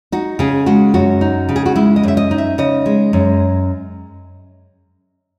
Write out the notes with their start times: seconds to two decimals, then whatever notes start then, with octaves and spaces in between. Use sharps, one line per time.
0.12 D#4 F#4
0.39 C#3 G#4
0.66 G#3 F#4
0.94 F#2 F#4
1.21 D#4
1.49 C#3
1.56 G#4
1.66 F#4
1.76 G#3 E4
1.96 D#5
2.03 F#2 E5
2.17 D#5
2.31 D#4
2.38 E5
2.58 C#3 D#5
2.86 G#3
3.13 F#2